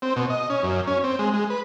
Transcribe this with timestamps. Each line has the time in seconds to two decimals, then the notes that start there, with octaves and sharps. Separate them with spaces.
0.02 C4
0.16 B2
0.30 D#5
0.50 C#4
0.63 F#2
0.87 C#4
1.04 C4
1.19 G#3
1.34 G#3
1.50 B4